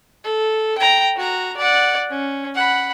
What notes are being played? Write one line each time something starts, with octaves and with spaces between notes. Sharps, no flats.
A4
G5 A#5
F#4 A#5
D5 F#5
C#4
F#5 B5